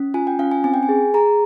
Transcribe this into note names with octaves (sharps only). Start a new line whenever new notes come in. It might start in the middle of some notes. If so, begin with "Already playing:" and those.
Already playing: C#4
F4 G#5
G5
C#4 F5
G#5
C4 G#5
G5
G#5
G#4
G#4 A#5